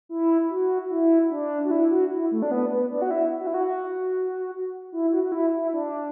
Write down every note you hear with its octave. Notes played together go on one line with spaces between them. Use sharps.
E4
F#4
E4
D4
F#4
E4
F#4
E4
A3
D4
B3
B3
D4
F#4
E4
F#4
E4
F#4
E4
F#4
F#4
E4
E4
D4